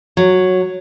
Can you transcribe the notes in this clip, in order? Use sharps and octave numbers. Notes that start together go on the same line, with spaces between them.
F#3